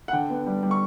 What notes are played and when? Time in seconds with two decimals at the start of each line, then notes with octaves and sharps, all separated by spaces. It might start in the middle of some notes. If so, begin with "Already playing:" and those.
0.08 F#5
0.13 D3 G5
0.30 B3
0.46 G3
0.63 G3
0.71 C#6